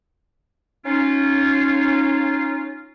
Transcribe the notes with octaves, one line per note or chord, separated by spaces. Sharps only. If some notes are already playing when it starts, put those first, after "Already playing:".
C#4 D#4 F4